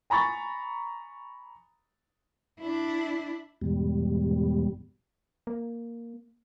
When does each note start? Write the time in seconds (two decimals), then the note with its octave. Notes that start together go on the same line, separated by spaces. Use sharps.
0.10 G#5 A#5 B5 C#6 A6
2.59 D4 E4
3.61 E2 G#2 B2 G3
5.47 A#3